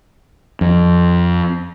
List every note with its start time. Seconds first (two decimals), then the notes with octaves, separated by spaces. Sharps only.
0.61 F2